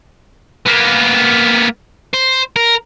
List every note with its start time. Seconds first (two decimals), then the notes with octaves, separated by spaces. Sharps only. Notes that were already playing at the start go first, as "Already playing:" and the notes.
0.66 A#3 B3
2.14 C5
2.56 A#4